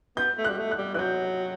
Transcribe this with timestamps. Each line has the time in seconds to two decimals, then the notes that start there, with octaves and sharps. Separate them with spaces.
0.17 B3 G6
0.38 A3
0.44 G3 F#6
0.58 A3
0.71 F#6
0.78 G3
0.94 E3 F#6
0.99 F#3 G6